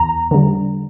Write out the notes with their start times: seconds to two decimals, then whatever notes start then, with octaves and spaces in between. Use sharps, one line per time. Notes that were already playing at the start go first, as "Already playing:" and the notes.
Already playing: E2 A#5
0.31 D3 G3